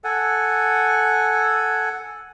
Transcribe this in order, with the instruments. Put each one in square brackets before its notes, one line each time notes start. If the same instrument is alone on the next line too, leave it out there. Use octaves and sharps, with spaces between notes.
[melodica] A4 F#5 G#5